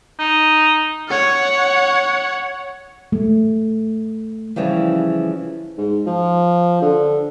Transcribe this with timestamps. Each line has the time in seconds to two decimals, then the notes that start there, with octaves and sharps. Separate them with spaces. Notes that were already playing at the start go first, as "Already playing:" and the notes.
0.19 D#4
1.09 C#5 F#5
3.12 A3
4.56 C#3 E3 F3 G3
5.77 G#2
6.07 F3
6.82 D3